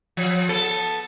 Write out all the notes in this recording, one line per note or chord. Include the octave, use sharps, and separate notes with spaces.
F3
B3 A4